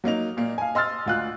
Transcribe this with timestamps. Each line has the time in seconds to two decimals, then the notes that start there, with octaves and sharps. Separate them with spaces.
0.04 F#3 A#3 D#4 F7
0.37 A#2 A#3
0.58 F5 G#5
0.75 D#5 C6 E6 F6 A6
1.06 D2 F4 F#6